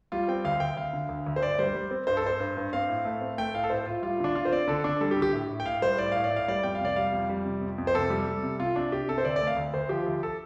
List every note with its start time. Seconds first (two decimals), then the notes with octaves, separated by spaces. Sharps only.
0.12 G3 F4
0.28 C4 G5
0.45 D2 F5
0.60 D2 G5
0.77 D2 F5
0.93 D3
1.09 D2
1.26 D2
1.36 C5
1.42 G2 D5
1.59 G3 C5
1.75 G3
1.91 C4
2.07 G2 C5
2.17 A4
2.24 G2 C5
2.40 G2
2.57 G2
2.73 C4 F5
2.89 A2
3.05 A3
3.21 C4
3.38 A3 G5
3.54 A2 F5
3.64 A4
3.70 A2 C5
3.86 A2 F4
4.02 G3 F4
4.20 D3 D4
4.35 D3 F4
4.45 C5
4.52 C4 D5
4.68 D3 A4
4.84 D3 D4
5.01 G3 A4
5.11 G4
5.17 D3
5.22 G4
5.33 A2
5.49 A2
5.60 G5
5.65 A2 F5
5.82 G3 C5
5.98 A2 D5
6.12 A2 F5
6.24 D5
6.31 A2
6.36 F5
6.48 G3 D5
6.63 F2 G5
6.75 F5
6.80 C3 D5
6.96 G3 F5
7.13 F2
7.29 G3
7.45 C3
7.61 F2
7.78 F2
7.87 C5
7.94 C3 A4
8.10 G3
8.27 G3
8.43 C3
8.59 C3 F4
8.76 C3 D4
8.92 C3 G4
9.08 C3 A4
9.18 C5
9.24 D2 D5
9.36 D5
9.41 A3
9.47 F5
9.57 D2
9.74 D2 C5
9.89 F3 G4
10.07 D2
10.23 A4